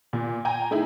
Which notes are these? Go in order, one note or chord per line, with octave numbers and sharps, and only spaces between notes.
A#2
G5 G#5 A#5
A3 D#4 E4 G#4